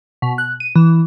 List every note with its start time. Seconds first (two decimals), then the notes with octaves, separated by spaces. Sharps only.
0.22 B2
0.38 F#6
0.60 D#7
0.75 E3